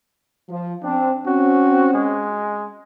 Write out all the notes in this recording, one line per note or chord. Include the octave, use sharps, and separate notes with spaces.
F3
C4 D4
C4 C#4 F#4
G#3